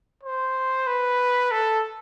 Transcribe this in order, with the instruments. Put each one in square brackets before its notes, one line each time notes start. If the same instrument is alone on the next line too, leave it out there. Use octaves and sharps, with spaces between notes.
[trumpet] C5
B4
A4